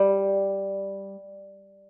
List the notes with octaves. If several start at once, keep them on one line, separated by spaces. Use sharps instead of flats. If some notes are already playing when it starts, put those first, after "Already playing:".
Already playing: G3